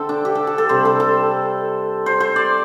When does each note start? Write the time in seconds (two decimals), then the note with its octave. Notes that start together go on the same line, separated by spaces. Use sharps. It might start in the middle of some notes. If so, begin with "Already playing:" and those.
Already playing: D3 A4 C5 E5 G5
0.09 D4
0.25 G4
0.35 A4
0.47 A4
0.58 A4
0.69 C3 G3 C5
0.85 A4
1.00 A4
2.06 C5
2.20 C5
2.36 D5